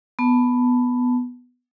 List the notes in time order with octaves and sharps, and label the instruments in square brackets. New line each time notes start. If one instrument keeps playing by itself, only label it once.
[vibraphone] B3 A5